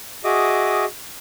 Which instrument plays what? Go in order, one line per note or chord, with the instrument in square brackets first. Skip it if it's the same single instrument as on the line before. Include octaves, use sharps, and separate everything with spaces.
[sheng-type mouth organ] F#4 G#4 D#5 E5 D6 D#6